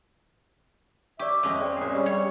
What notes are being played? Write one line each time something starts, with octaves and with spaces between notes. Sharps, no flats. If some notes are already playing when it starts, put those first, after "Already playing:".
G4 D5 E5 C#6 D6
F2 G#3 C#4 D#5
C4 G#4 D5 G5
A#1 G#4 D#6
G3 C#4 D5 D#5
G3 C#5